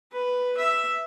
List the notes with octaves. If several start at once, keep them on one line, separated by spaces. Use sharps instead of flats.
B4
E5